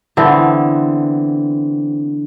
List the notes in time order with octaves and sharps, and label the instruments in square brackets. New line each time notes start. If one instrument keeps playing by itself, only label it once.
[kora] D3 E3 B3 C4